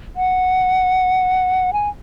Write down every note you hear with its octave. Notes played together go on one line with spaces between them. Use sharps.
F#5
G#5